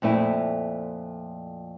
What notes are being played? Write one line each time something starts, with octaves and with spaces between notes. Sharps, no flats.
F2 A#2 A3 E4